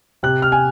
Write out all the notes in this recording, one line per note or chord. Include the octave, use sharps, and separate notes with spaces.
C3 F#6
F6
G#5